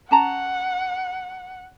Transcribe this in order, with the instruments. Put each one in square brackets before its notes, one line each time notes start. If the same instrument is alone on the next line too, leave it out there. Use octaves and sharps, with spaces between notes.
[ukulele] C#4 A5 A#5 [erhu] F#5